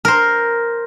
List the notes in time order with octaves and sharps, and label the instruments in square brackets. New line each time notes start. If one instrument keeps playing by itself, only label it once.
[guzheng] A#4 C5